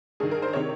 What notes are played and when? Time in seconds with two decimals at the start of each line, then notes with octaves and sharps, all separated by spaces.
0.20 G2 D#3 G#4
0.31 A#4
0.42 C5
0.53 C3 D#3 C#5